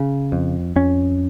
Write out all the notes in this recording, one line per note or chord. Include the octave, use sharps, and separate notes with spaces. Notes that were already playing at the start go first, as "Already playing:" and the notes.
Already playing: C#3
F2
F2 C#4